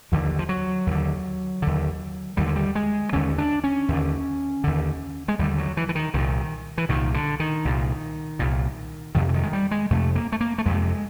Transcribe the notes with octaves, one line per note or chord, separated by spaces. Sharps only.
D#2 D3 F3
F3
F#3
D#2 D3
D#2 D3
D#2 D3 G3
G#3
G3
G#3
D#2 D3 C#4
D4
C#4
D#2 D3
D#2 D3
G#3
D#2 D3 G3
F#3
E3
E3
D#3
C2 A#2 D#3
E3
C2 A#2 D#3
D3
D#3
C2 A#2
C2 A#2
F2 C3 D#3
E3
D#3
G#3
G3
G#3
F2 C3 A3
A#3
A3
A#3
A3
F2 C3 G#3